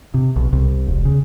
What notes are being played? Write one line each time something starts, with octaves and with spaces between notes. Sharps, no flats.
C3
B1
C2
E1
C#3